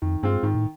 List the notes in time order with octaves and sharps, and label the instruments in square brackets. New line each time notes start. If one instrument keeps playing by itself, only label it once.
[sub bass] F2 [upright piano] D#3
[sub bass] G2 [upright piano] G#3 C4 F4
[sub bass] G#2 [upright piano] D#3
[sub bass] A2